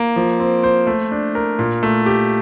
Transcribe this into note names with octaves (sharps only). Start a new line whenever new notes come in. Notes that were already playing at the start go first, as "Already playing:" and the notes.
Already playing: A#3
F3
C4
C5
A3
D4
A#4
A#2
A3
G4